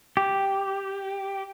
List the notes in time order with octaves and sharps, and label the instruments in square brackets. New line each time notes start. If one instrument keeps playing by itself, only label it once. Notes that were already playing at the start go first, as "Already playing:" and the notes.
[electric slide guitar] G4